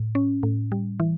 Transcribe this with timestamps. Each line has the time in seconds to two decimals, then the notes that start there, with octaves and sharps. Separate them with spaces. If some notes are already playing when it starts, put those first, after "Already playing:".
Already playing: A2
0.15 C#4
0.43 A2
0.72 G3
1.00 E3